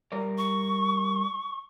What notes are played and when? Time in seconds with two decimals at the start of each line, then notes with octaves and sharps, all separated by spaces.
0.12 G3 A#4 D5
0.38 C#6